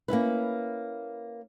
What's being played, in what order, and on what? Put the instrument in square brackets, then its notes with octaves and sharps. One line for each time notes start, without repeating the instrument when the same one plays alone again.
[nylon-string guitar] A#3 C#4 E4 B4